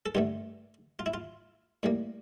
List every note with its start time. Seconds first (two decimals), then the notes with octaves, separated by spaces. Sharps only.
0.06 A4
0.15 G2 D3 A3 G4
0.99 F4
1.06 E4
1.14 F4
1.83 A2 G3 A#3